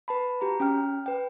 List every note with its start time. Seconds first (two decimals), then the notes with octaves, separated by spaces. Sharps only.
0.08 B4 A5 B5
0.41 F#4 G4 A#5
0.60 C#4 G5 F6
1.06 B4 G5